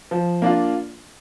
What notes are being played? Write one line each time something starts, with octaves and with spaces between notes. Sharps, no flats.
F3
A#3 D4 F4